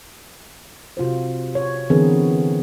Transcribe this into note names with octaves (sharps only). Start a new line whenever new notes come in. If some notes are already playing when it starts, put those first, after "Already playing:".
C3 F4 F#4 C5
C#5
D3 E3 B3 C4 G#4 A#4